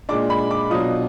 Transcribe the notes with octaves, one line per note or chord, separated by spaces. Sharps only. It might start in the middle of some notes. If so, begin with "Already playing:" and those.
A#2 G#3 D4 D6
B5
D6
B2 F#3 D4 F4 D#6